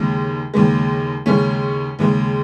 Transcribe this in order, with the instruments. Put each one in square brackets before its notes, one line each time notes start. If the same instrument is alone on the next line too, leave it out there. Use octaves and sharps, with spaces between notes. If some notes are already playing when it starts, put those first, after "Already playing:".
Already playing: [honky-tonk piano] D#2 C#3 G#3
D#2 C#3 G#3
D#2 C#3 G#3 C#4
D#2 C#3 G#3